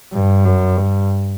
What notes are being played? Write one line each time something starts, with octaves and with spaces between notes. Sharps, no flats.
G2
F#2
G2